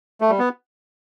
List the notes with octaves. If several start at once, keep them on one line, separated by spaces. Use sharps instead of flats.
A3
G3
B3